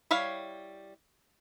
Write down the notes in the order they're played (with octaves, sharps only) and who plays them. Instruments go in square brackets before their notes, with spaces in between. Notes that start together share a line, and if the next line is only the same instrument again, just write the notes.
[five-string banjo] G3 E4 C#5 F5